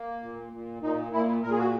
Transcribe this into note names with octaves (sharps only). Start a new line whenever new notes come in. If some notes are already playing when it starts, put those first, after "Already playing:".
Already playing: A#3
A#2
A#2
A#2 D#4
A#2 E4
A#2 A#4
G#4
F#4